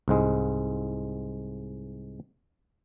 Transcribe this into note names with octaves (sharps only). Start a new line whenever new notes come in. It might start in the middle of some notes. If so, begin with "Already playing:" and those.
C2 G#2 G#3